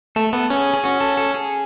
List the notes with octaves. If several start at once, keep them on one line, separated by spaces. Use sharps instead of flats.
A3 A4
B3 A4
C#4 G#4
G#4
C#4 F#4
A4
A4
G#4